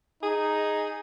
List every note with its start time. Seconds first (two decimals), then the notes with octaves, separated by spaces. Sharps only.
0.23 D#4 G#4